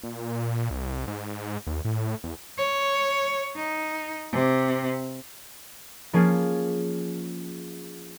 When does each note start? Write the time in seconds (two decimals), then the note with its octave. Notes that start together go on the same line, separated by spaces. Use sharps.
0.04 A#2
0.71 C2
1.08 G#2
1.67 D#2
1.85 A2
2.24 E2
2.58 C#5
3.56 D#4
4.32 C3
6.13 F3 A#3 C#4 F4 G#4